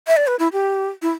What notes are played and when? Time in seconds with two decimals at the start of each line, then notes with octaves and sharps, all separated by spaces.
0.07 E5
0.17 D5
0.27 B4
0.39 E4
0.53 G4
1.02 E4